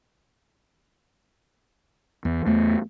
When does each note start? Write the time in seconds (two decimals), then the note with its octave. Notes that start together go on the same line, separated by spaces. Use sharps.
2.25 E2
2.46 E2 A3